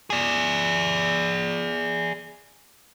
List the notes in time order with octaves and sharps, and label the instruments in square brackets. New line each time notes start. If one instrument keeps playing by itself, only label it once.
[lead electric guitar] G#4 D5